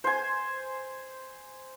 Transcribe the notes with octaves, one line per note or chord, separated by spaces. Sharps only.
C5 G#5